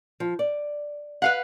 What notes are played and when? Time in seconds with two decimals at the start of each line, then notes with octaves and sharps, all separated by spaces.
0.20 F3
0.39 D5
1.22 B4 F5 F#5